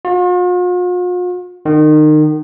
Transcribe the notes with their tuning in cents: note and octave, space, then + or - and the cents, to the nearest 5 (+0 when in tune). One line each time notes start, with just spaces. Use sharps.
F4 +45
D#3 -30